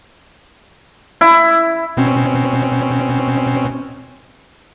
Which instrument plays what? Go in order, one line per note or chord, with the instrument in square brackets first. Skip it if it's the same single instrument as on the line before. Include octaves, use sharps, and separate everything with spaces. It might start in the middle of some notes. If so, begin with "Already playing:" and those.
[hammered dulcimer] E4
[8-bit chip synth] B2 C4 C#4